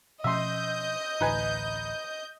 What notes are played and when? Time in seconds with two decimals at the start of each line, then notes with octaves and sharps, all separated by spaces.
0.24 B2 F3 C#4 D#5 E5 C6 G6
1.21 A1 D2 D#4 B4 G#5